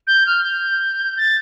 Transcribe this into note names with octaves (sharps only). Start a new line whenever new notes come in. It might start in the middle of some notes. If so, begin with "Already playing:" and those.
G6
F6
G6
A6